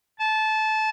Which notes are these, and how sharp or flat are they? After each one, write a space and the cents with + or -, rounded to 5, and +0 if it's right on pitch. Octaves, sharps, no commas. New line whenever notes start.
A5 -20